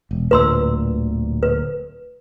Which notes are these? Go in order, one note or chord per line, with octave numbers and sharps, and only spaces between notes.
E1
D1 D2 A#2 B4 C6 E6
B4